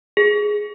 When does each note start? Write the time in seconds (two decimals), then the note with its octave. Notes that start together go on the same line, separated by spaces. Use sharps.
0.17 G#4